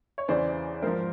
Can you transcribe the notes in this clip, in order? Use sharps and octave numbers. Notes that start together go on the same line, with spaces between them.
C#5
E2 C#3 E3 C5 D5
G#2 F3 A#4 C5